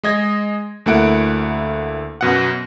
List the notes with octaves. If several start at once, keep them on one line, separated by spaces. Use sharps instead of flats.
G#3 D#5 G#6 A#6
D2 A3 A#3 E4 F#5 D7
F#2 B2 F#5